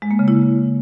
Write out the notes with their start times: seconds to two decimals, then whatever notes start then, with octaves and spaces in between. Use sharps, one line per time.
0.02 G#3
0.11 A#3
0.19 C#3
0.28 E4